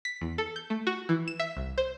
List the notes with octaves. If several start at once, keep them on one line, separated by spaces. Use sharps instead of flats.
B6
E2
A4
G6
A3
F#4
E3
E7
E5
C2
C5